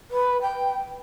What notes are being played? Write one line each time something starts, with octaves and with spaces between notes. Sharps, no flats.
B4
G5